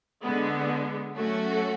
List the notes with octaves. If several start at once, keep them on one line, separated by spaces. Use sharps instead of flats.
D3 G#3 B3
F#3 A3 C#4 F#4